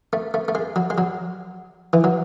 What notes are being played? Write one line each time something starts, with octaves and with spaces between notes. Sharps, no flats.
A3
A3
A3
G#3
F#3
G#3
F#3
E3
F#3